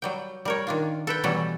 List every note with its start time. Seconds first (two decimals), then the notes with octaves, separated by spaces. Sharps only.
0.02 F#3 G3 G5
0.45 G3 A#4 C#5
0.67 D#3 D4 F4
1.07 A4 B4 G5
1.24 B2 E3 F#3 G3 C#4 A4